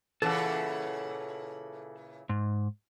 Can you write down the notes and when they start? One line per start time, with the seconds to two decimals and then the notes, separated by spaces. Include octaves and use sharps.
0.22 A#2 C#3 E3 A4 F#5
2.29 G#2